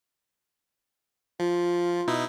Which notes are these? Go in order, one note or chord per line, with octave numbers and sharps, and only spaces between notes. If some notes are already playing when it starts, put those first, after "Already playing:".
F3 F4
B2 D#4 E4